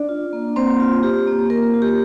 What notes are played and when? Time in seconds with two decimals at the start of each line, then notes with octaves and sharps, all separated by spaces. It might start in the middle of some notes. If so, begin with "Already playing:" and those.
Already playing: D4 D5
0.09 F4
0.33 A#3
0.56 A#3 C4 C5
0.80 F4
1.03 F4 G4
1.27 A#3
1.50 A#3 A#4
1.74 F4
1.82 G4